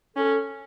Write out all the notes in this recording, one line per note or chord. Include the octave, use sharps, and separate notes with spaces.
C#4 A4